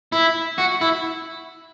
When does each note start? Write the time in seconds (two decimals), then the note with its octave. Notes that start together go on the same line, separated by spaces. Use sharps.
0.12 E4
0.58 F#4
0.81 E4